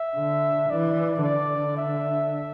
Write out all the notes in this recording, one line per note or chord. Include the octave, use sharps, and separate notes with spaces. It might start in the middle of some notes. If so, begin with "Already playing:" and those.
Already playing: E5
D3
E3 D5
D3 D5
E5